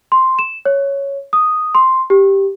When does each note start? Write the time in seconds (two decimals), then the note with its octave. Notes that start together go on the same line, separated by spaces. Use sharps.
0.12 C6
0.39 E7
0.65 C#5
1.33 D#6
1.75 C6
2.10 G4